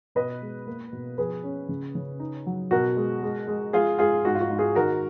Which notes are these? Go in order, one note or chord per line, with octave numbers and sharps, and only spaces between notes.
B2 B4 D#5
G#3
A#3
B2
F3 G#4 B4
C#4
C#3
C#3
D#4
F#3
B2 F#4 A#4
G#3
G#3
G#3
G#3 F4 G#4
G#3 F4 G#4
G#2 F#4
F4
F#4
G#2
F4 G#4
D#3 F#4 A#4